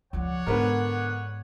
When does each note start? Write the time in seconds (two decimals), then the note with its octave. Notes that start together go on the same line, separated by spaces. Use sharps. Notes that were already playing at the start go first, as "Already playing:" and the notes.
0.13 C#2 F3 C#5 D5 F#5
0.47 G#2 D3 B3 A#4